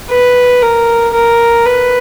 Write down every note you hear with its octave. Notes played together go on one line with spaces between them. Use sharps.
B4
A#4
A#4
B4